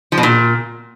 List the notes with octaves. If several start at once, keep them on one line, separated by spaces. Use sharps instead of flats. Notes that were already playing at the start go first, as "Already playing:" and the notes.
F3
B2
A#2